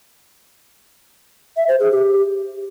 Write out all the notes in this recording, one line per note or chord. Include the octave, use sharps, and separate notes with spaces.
E5
C5
G#4
G4